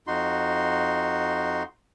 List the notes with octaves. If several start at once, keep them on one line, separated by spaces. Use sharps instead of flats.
F2 D#4 F#4 C6